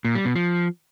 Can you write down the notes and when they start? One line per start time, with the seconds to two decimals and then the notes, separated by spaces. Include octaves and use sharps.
0.05 A#2
0.15 G3
0.25 B2
0.36 F3